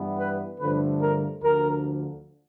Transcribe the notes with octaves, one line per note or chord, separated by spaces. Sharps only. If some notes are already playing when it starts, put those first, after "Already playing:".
Already playing: G2 E3 G3 B3
B4
G2 D3 F3 A3 B4
A#4
D2 D3 F3 A#4